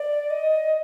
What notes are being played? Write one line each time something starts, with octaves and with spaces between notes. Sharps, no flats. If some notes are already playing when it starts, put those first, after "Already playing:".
Already playing: D5
D#5